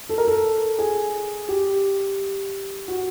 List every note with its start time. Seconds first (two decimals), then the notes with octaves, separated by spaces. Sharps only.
0.09 A4
0.18 A#4
0.28 A4
0.78 G#4
1.48 G4
2.88 F#4